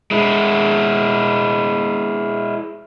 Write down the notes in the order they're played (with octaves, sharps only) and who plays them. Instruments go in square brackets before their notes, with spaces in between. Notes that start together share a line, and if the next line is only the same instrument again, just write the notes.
[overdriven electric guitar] G#3 E4